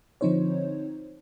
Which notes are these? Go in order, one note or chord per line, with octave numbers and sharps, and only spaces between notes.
D3 F3 C4 D#4 C5 C#5